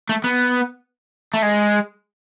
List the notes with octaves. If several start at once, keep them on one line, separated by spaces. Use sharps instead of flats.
A3
B3
A3
G#3